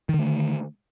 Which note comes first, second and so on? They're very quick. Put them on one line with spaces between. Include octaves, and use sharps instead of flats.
D#3 D3 A3